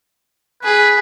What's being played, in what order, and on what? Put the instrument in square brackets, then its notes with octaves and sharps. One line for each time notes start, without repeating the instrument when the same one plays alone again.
[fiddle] G#4 [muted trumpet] B4